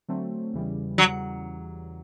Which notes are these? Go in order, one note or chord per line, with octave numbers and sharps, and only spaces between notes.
D3 F#3 A3 C4
E2 C#3 E3 G3
F#3